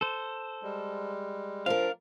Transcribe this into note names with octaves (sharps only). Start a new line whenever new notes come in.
A4 C5
G3 G#3
F3 D4 A#4 F5